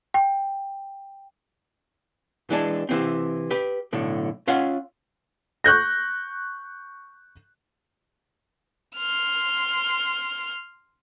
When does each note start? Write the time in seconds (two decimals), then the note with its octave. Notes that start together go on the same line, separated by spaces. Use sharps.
0.14 G5
2.50 E3 G#3 D4
2.89 C3 E3 C4
3.51 G4 B4
3.93 B1 A2 D3
4.47 C#4 F4 F5 F#5
5.64 C#6 F#6 G6 A#6
8.96 C6 F6